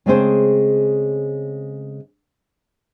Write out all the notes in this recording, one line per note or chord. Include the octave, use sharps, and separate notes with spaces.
C#3 G#3 A3 C4 G#4 C5